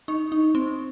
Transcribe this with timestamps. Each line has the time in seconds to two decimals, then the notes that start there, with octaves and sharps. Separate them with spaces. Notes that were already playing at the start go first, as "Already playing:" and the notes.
0.08 D#4 C#6
0.32 D#4
0.55 C4